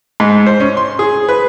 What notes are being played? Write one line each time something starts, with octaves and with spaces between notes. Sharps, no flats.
G#2
C5
C#4
C6
G#4
B4